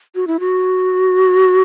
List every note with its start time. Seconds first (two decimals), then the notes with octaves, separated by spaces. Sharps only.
0.15 F#4
0.27 E4
0.40 F#4